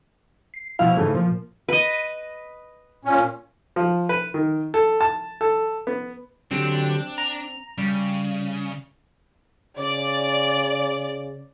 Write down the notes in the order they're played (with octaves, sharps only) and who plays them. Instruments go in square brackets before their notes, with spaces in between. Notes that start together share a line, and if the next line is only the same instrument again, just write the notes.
[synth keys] C7
[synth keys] B2 F3 E4 [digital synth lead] F5
[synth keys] G#2 C#3 E3 [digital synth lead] A3
[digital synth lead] A#2 [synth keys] F3
[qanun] B4 D#5
[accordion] A#2 C#4
[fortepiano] F3
B4
D#3
A4
A5
A4
B3
[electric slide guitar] D3 F#3 G4 [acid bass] C4 [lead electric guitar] D4
[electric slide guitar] A#5
[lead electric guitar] C#3 [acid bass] G3
[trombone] C#3 [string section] D5